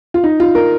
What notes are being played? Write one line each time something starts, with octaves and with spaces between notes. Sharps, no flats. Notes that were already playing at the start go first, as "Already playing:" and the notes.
F4
D#4
F4
A#4